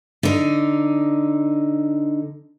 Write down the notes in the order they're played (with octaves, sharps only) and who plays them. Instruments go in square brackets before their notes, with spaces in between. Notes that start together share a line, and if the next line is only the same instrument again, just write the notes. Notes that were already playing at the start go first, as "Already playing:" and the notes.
[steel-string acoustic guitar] D3 D#4